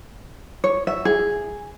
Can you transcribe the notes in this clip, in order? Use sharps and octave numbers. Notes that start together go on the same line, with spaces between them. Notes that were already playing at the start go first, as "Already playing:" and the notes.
C#5
E5
G#4